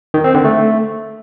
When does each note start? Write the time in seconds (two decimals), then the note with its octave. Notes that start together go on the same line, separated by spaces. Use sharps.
0.14 D#3
0.24 C4
0.34 D3
0.45 A3